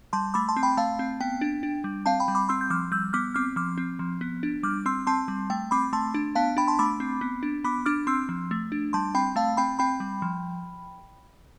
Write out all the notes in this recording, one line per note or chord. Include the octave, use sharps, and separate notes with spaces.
G3 A5 C6
A3 B5 D6
A5 C6
C4
G5 B5
A3 F5 A5
C4
B3 G5
D4
D4
G3
C4 F5 A5
G5 B5
G3
B5 D6
C4 C6 E6
G6
F3 D6 F6
G3 E6 G6
B3 D6 F6
C4 D6 F6
F3 D6 F6
C4
F3
B3
D4
G3 D6 F6
C4 C6 E6
C4 A5 C6
G3
A3 G5
C4 B5 D6
A3 A5 C6
D4
B3 F5 A5
D4 G5 B5
A5 C6
A3 B5 D6
C4
B3
D4
B3 B5 D6
D4 D6 F6
C4 C6 E6
F3
A3
D4
G3 A5 C6
C4 G5 B5
A3 F5 A5
C4 G5 B5
C4 G5 B5
G3
F3